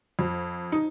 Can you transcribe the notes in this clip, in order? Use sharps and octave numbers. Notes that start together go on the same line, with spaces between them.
F2
D#4